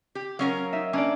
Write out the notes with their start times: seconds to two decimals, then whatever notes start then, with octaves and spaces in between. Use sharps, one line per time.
0.15 G4
0.39 F#3 C#4 A#4 F5
0.73 D#4 E5
0.93 A#3 C#4 D4 D5